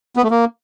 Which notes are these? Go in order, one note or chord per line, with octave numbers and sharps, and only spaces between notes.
B3
A3
A#3